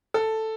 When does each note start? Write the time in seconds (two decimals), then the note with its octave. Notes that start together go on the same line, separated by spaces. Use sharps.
0.14 A4